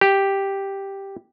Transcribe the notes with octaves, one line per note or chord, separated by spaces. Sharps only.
G4